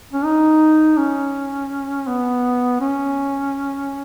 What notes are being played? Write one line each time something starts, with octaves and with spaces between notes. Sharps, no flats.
C#4
D#4
C#4
B3
C#4